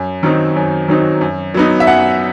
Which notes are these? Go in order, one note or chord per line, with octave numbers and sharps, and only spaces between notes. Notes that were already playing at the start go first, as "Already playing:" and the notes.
Already playing: F#2
D#3 F#3 C4 D#4
F#2
D#3 F#3 C4 D#4
F#2
F#3 B3 D#4
E5
F#2 F#5